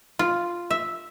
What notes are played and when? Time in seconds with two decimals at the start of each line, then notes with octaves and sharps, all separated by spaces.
0.19 F4
0.70 E5